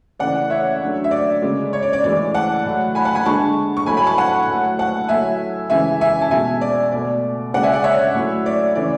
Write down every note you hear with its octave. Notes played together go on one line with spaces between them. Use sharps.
C#3 E3 A3 D5 F#5
C#5 E5
D3 F#3 A3
E5
D5
C#3 G#3
C#5
D5
D5
A2 E3 G#3 D5
F#5 A5
A2 F#3 A3
G#5 B5
F#5 A5
G#5 B5
D3 G#3 A5 C#6
C#6
A2 F#3 A3 G#5 B5
G#5 B5
A5 C#6
F#5 A5
A2 F#3 A3
F#5 A5
A2 F#3 A3 E5 G#5
C#3 E3 G#3 E5 G#5
E5 G#5
A5
B2 G#3 E5 G#5
D5
B2 A3 D5
C#3 G#3 D5 F#5
E5 G#5
D5 F#5
C#5 E5
A2 F#3 A3
D5
C#3 E3 A3 D5